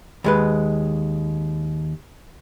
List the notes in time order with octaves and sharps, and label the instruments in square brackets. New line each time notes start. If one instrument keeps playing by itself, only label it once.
[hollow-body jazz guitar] D#2 G#3 B4